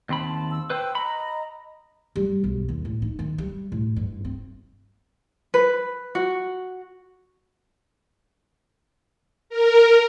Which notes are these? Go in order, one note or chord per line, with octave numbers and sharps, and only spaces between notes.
D#2 C4 A5 B5
E6
B4 C5 G5 E6
D#5 A#5 B5
G3
B1
D#2
A2
D#4
D#3
G3
A2
G2
C4
B4
F#4
A#4